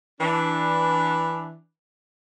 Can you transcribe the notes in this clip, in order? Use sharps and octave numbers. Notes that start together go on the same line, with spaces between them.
E3 D4